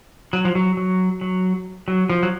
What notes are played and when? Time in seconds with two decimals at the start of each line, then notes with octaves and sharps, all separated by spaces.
0.33 F#3
0.45 F3
0.55 F#3
0.77 F#3
1.21 F#3
1.88 F#3
2.10 F3
2.23 F#3